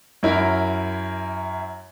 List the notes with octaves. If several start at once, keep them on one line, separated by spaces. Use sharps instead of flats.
F#2 C#4 E4 A#4